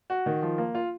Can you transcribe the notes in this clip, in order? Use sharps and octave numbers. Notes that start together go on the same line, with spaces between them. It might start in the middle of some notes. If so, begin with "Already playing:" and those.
F#4
D#3
F3
A#3
F4